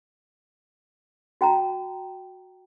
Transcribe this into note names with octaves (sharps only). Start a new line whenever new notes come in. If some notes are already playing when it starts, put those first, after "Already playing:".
F#4 G5 A5 A#5